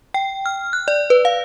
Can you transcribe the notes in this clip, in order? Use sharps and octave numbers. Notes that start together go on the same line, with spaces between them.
G5
F6
F#6
D5
B4
F5